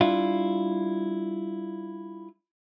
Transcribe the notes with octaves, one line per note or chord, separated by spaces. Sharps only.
G3 D4 E4 F4